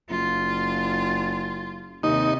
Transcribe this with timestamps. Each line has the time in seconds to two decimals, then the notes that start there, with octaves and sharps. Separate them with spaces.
0.10 F#1 F4
2.03 D#2 C3 D#4